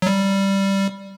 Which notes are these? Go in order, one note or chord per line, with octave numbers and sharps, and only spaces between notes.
F#3
G3